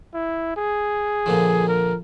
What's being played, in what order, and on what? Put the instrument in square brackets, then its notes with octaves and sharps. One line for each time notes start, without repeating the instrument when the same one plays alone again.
[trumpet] E4
G#4
[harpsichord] A#2 D3 F3
[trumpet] A#4